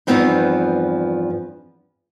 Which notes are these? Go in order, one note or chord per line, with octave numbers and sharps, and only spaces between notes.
E2 G2 F3 B3 C4 D#4